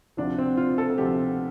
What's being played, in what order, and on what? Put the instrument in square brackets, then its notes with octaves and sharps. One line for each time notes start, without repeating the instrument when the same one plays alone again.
[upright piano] D2 C3 F3 D4
C4
F4
A4
A4
D2 C3 F3 G4